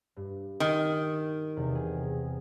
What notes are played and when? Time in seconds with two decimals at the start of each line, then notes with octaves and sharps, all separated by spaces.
0.16 G2
0.60 D#3
1.56 E2 C3
1.75 G#4